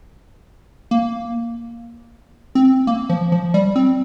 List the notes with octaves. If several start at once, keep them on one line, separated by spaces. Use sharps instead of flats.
A#3
C4
A#3
F3
F3
G3
C4